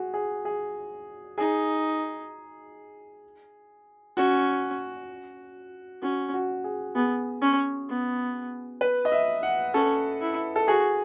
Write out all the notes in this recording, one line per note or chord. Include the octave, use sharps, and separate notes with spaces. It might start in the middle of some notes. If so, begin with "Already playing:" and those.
Already playing: F#4 G#4
G#4
G#4
D#4 G#4
C#4 F#4
C#4 F#4
F#4
G#4
B3 G#4
C#4
B3
B4
D#5
E5
F#5
C#4 A4
E4
A4
F#4 G#4